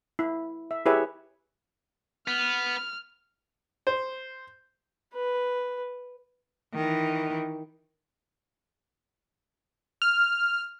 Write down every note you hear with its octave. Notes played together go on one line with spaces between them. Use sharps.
E4
E5
E4 G4 G#4 B4 C#5 E5
B3 F6
C5
B4
D#3 E3
F6